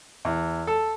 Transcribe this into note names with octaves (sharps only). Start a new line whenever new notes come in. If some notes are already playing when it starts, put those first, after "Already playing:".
E2
A4